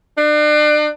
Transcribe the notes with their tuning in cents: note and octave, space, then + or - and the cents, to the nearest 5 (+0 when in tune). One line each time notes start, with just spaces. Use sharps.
D4 +35